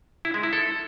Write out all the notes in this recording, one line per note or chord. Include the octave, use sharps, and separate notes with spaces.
E4
G#3
E4
A4